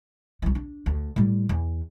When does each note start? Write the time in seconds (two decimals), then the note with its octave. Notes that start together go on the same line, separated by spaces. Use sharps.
0.42 C2 E3
0.55 D4
0.86 D2
1.16 A2 G3
1.49 E2